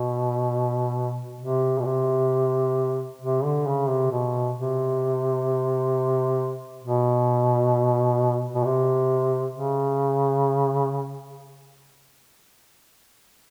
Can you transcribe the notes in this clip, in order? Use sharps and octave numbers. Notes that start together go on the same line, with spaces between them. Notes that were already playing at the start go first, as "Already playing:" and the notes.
Already playing: B2
C3
B2
C3
C3
D3
C#3
C3
B2
C3
B2
B2
C3
C#3